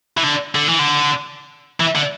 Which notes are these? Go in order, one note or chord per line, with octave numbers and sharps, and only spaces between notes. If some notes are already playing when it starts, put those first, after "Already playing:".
E3
D3
D3
E3
D3
E3
D3